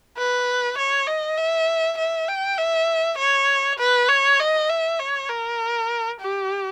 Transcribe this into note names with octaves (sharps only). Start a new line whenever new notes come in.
B4
C#5
D#5
E5
E5
G5
E5
C#5
B4
C#5
D#5
E5
C#5
A#4
G4